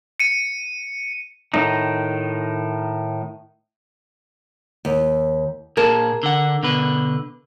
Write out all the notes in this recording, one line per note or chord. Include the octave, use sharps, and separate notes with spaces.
C#7 D#7
A2 D#3 D#4
D#2
A#2 G#4 A#4 A5
D3 F#5
B2 D3 B4